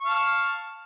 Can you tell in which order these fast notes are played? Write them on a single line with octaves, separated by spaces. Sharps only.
C#6 F5 A5